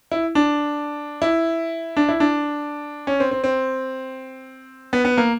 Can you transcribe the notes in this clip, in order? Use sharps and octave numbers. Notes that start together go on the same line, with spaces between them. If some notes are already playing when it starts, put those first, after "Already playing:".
E4
D4
E4
D4
E4
D4
C#4
C4
C4
C4
B3
B3
A#3